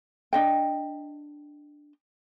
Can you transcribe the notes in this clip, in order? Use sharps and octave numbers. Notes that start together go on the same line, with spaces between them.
D4 D#5 G5